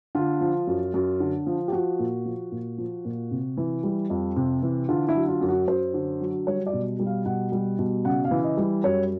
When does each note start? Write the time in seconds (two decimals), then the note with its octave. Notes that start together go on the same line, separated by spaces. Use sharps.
0.15 D3 F4
0.41 F3
0.67 F#2
0.94 F#2
1.20 D3
1.46 F3
1.68 G4
1.72 F3 F#4
1.99 A#2
2.25 F3
2.52 A#2
2.78 F3
3.05 A#2
3.31 C3
3.57 E3
3.83 G3
4.10 F2
4.36 C3
4.63 E3
4.89 D3 F4
5.09 E4
5.15 F#3
5.28 F4
5.41 F#2
5.48 F#4
5.68 F#2 C5
5.94 D3
6.21 F#3
6.47 G3 C#5
6.67 D5
6.73 B2
6.99 G3
7.06 F5
7.26 B2 F#5
7.52 G3
7.79 B2
8.05 C#3 F#5
8.25 F5
8.31 E3
8.44 D#5
8.57 G3
8.84 F#2 C#5